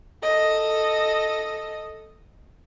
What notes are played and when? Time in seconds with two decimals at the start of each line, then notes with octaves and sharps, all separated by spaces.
0.23 A4 D#5